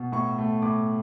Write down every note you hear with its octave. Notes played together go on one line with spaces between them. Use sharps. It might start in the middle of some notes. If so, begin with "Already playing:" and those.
Already playing: B2
A2 C#6
A3
A2 D6